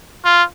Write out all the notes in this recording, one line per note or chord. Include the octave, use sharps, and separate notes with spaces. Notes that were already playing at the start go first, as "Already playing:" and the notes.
F4